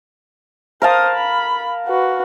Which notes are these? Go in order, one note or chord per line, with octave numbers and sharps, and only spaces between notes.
A#4 C5 F5 A5 D#6
B5
F#4 B4